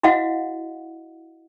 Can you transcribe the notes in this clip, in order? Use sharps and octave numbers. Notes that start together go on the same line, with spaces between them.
E4 F#4 D#5 F5 F#5